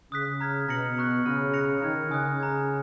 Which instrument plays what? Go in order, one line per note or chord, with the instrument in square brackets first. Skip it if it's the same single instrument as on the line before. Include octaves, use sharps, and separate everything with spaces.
[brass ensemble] C#3 [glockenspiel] D#6 F#6 B6
[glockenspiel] A#5 F6 G#6 B6
[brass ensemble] B2 [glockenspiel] A#5 F6 A#6 C#7 F#7
[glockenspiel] A#5 C#6 F#6
[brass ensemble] C#3 [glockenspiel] B5 F6 A#6 D#7
[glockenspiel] F#6 A#6 C#7 F7
[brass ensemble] D#3 [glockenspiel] A#5 F6 G#6
[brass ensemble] C#3 [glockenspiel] G#5 D#6 F#6 A#6
[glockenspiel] A#5 D#6 G#6